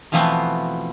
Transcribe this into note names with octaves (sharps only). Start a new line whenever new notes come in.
B2 E3 F3 A3 B3 C4